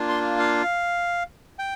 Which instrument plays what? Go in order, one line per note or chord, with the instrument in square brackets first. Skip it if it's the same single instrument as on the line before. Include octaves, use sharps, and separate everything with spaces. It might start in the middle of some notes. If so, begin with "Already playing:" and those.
Already playing: [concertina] A#3 D4 F4
C6
F5
G5